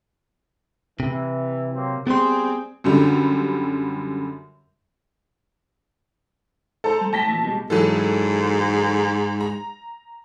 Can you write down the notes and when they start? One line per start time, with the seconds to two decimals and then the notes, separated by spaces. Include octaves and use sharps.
1.00 C3 E3
1.75 F#3 A#3 C4
2.07 G3 B3 C4 G#4 C6
2.84 F#2 D3 G3
6.84 A4 C5 A#5
7.01 G3
7.13 A2 G5 A5 A#6 B6
7.27 D#2 A#2 E3
7.43 B2 G3 G#3
7.70 G#2 E3 F#3 A4
9.41 A#5